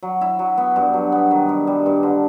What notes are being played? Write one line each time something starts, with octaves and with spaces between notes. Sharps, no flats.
F#3
E4
F#3
B3
G2
F#3
B3
D#3
G2
G3
G2
D3